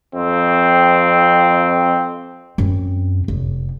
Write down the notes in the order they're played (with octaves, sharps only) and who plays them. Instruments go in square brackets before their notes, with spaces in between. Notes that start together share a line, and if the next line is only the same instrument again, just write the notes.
[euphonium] F2 [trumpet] C4
[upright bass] F#2 C4
F1